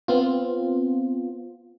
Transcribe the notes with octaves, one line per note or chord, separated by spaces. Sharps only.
B3 C4 F4